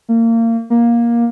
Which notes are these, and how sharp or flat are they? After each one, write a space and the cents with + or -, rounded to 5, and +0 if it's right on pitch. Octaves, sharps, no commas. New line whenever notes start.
A#3 -30
A#3 +15